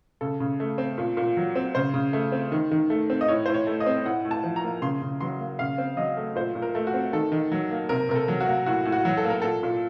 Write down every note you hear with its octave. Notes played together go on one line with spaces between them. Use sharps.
C#3 A4
C#3
A3
C4
A#2
A#2
F#3
C4
C#3 C5
C#3
A3
C4
D#3
D#3
A3
C4
D#5
A2 C#5
A2 C5
C#5
A3
D#5
C4
A2 F#5
A2
A5
F3
A#5
A#3
C#3 C6
C#3
F#3 C6
A#3
C#3 F5
C4
F#3 D#5
A3
A#2 C5
A#2
A#4
A3
F#4
C4
D#3 A4
D#3
F#3
A#3
C3 A#4
C3 A#4
A4
F#3
F#4
A#3
A2 F#4
A2
F#4
F#3
A4
A#3
A#4
A#2 A4
A#2